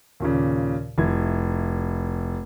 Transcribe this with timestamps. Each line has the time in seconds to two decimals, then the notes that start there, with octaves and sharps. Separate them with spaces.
0.20 D#2 A#2 C#3
0.98 F1 E4 G#6